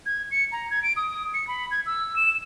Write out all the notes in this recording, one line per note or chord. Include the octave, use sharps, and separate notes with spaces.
G#6
C#7
A#5
G#6
D7
D#6
C#7
B5
G#6
E6
E7